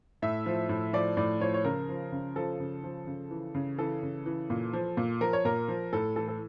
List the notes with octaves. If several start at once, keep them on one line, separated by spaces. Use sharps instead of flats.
A2 E5
F3
A2
F3 D5
A2 D5
F3 C#5
C#5
C#3 A#4
F3
C#3
F3 A4
C#3
F3
C#3
E3
C#3
E3 A4
C#3
E3
A#2
F3
A#2
F3 A#4
C#5
A#2 A#4
F3
A2 A4
E3 A4
A4